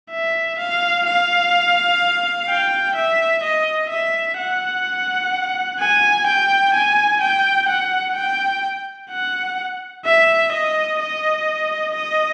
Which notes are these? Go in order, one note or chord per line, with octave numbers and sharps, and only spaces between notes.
E5
F5
F5
G5
E5
D#5
E5
F#5
G#5
G5
G#5
G5
F#5
G5
F#5
E5
D#5
D#5
D#5